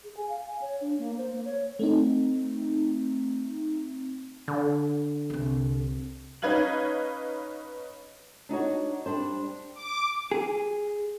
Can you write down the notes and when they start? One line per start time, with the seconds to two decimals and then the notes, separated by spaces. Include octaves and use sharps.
0.04 G#4
0.17 G#5
0.29 F5
0.46 G#5
0.61 C#5
0.81 D4
0.98 A#3
1.18 C5
1.33 A#3
1.45 C#5
1.79 A3 C4 D#4
4.48 D3
5.30 C2 C4
6.42 C#4 D#4 B4 F5 G#6 F#7
8.49 D4 D#4 F#4 C#5
9.06 G3 D4 C5
9.74 D6
10.32 G#4